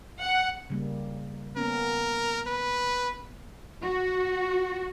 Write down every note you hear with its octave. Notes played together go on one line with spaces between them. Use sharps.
F#5
C#3 G3 A#3
A#3 B3 C#4 A#4
B4
F#4